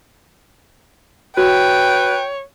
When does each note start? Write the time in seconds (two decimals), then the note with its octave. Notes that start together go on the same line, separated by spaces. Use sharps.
1.37 F#4 B4 C#5 G5